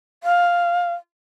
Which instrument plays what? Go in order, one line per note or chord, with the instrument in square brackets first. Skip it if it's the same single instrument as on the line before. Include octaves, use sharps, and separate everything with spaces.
[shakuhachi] F5